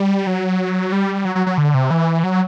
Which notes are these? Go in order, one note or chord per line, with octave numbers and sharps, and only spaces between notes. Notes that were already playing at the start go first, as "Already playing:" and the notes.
Already playing: G3
F#3
G3
F#3
F#3
F#3
D3
C3
E3
F#3